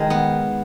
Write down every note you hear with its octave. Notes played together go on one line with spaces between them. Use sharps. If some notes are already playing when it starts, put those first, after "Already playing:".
Already playing: D#3 G#3 G#4
B3